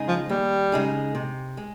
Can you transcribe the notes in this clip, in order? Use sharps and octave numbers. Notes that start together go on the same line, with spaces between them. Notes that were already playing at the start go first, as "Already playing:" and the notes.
Already playing: C#3 G#3 D#4 G#4
F3
D#2 G3
C#3 G#3 D#4 G#4
C3
G#3